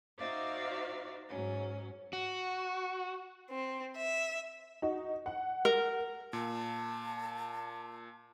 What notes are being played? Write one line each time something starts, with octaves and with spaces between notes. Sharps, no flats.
D#4 F#4 C5 D5 E5 F5
G#2 F#3 C#4
F#4
C4
E5
D#4 F#4
F#5
A#4
A#2 A5